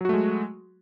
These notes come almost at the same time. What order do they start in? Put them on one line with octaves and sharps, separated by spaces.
F#3 F#4 A3 G#3